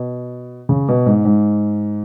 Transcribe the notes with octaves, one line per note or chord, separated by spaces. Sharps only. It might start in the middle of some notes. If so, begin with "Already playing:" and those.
Already playing: B2
C#3
B2
G#2
G#2